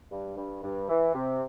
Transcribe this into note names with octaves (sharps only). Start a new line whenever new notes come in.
G2
G2
G2
E3
C3